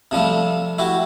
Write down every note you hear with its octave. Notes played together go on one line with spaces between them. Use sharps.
C3 F3 G3 A3
E4 F#4 G4